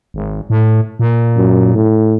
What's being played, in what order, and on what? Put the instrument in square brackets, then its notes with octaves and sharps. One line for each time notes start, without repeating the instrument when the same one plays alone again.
[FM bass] G#1
A2
A#2
[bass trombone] F#2
A2